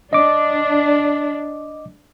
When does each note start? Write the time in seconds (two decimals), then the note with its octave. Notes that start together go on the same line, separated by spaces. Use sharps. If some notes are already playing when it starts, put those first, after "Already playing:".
0.13 D4 D#5 D6